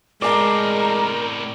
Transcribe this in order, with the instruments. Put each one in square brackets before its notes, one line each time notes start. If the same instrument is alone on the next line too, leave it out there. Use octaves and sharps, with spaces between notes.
[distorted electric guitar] A2 C4 [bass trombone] G#3 [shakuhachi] A#4 [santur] D5 A5